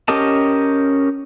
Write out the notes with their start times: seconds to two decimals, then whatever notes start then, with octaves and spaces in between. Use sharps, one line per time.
0.08 C#4 G4 A#4 D#5 A5